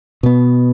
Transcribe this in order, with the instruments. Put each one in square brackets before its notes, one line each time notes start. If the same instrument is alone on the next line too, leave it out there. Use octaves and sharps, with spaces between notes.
[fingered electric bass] B2 B3